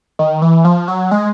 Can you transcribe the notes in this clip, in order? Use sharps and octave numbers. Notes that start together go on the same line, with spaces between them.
D#3
E3
F3
F#3
G#3